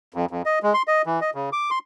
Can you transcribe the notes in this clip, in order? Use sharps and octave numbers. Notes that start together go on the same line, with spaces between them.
F2
F2
D#5
G#3
C6
D#5
E3
D#5
C#3
D6
C6